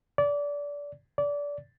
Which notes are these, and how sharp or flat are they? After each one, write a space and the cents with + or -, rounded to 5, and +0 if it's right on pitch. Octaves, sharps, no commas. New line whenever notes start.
D5 -25
D5 -25